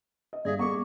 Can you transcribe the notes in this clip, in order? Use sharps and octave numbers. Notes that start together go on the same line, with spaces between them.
D#5
G2 G#4 D5 E5 F5
G3 B3 G#4 A#5 C#6 D6